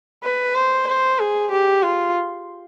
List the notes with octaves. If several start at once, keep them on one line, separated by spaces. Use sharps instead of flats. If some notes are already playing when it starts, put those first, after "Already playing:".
B4
C5
C5
G#4
G4
F4